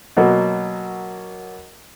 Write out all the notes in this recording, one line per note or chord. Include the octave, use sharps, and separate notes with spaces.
B2 F#3 A#3